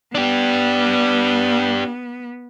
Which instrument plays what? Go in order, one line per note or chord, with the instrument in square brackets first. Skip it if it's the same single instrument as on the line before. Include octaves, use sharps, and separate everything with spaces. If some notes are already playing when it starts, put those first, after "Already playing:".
[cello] B3 [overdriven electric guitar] D4 G4